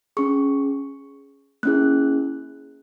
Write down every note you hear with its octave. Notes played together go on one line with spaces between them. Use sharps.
C#4 G#4 C#6
A#3 C#4 E4 G#4 F#6